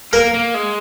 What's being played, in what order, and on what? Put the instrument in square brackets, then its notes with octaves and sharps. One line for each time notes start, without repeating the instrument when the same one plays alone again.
[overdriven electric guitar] A#3 [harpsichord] A#4
[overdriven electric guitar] A#3
G#3